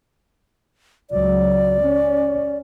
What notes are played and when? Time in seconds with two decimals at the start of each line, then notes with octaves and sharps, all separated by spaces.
1.11 C#2 F#3 D5
1.80 C#4